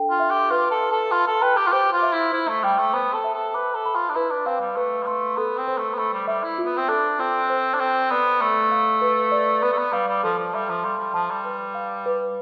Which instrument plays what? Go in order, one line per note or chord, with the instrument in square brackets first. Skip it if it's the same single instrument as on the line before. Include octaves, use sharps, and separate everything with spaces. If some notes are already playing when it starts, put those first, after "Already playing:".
Already playing: [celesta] D4 A4 G5
[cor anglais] F4
[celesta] E5
[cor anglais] G4
[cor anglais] F4 [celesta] B4
[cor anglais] A4
[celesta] E5
[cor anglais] A4
[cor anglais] F4 [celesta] B5
[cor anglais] A4
[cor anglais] B4 [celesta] G5
[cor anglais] G4
F4
[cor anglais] G4 [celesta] C5
[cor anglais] F4
[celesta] E5
[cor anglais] E4
[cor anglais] E4 [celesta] C5
[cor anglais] A3
[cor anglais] G3 [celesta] G5
[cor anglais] A3
[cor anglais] B3 [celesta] C5
[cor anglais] A4
[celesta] E5
[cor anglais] A4
[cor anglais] B4 [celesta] D6
[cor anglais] A4
[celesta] B5
[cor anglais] F4
D4
[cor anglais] E4 [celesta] B4
[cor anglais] D4
[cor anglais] C4 [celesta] F5
[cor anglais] G3
[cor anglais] A3 [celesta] B4
[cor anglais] G3
[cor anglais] A3 [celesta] C6
[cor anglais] B3 [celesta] A4
[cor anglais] C4
[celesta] C5
[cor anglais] A3
B3
[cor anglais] A3 [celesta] B5
[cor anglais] G3
[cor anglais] G3 [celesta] E5
[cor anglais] E4
[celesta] F4
[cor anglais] B3
C4
[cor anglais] D4 [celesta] A4
[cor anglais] C4 [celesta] F4
[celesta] C5
[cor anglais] D4
[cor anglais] C4 [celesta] A4
[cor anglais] B3 [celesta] D5
[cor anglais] A3 [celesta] B5
[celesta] F5
B4
D5
[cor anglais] B3 [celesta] B4
[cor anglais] A3
B3
[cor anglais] G3 [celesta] F5
[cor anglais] G3
[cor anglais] F3 [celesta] A4
[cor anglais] F3
[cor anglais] G3 [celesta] E5
[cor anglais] F3
[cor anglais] G3 [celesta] C6
[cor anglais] G3
[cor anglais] F3 [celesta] A5
[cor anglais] G3
[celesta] B4
F5
B4